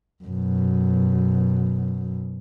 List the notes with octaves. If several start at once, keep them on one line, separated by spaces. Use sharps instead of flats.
F#2 B2